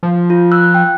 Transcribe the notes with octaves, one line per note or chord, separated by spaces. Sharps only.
F3
F4
E6 F#6
G5